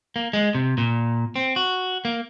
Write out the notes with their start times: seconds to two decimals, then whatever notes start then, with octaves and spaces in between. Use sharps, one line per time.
0.16 A#3
0.33 G#3
0.55 C3
0.78 A#2
1.36 C4
1.56 F#4
2.05 A#3